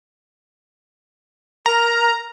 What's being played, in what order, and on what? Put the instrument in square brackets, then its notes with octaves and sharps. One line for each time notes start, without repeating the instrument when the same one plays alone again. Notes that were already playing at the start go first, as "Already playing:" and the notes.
[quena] A#4 [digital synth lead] A#5